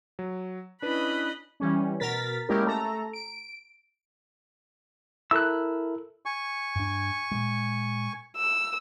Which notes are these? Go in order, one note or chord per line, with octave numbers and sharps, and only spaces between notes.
F#3
C#4 D4 E4 B4 D#5 B5 F#6
E3 G3 C#4
B2 A#4 A6 B6
G#3 A#3 C#4 E4 G4 A#4
A3 A4 A#5
D7
E4 A4 A#4 E6 F#6
G#5 C#6
G2 D4
A#2 G#3
E6